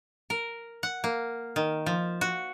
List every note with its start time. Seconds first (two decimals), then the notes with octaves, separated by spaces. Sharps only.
0.30 A#4
0.83 F#5
1.04 A#3
1.56 D#3
1.86 F3
2.21 F#4